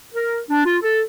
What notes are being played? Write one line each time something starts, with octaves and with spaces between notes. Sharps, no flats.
A#4
D4
F4
A4